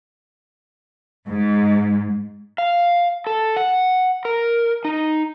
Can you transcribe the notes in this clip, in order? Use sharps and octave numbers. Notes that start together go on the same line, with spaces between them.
G#2
F5
A4
F#5
A#4
D#4